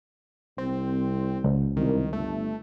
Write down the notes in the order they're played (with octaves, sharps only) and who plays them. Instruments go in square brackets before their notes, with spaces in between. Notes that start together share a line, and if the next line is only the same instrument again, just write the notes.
[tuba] C2 [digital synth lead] C4
[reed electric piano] C#2
[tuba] C2 [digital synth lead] D#3
[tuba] G1 [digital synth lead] A3